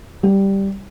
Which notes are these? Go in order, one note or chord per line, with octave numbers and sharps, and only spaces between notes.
G3